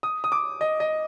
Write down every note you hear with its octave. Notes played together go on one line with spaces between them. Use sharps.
D#6
D#6
D6
D#5
D#5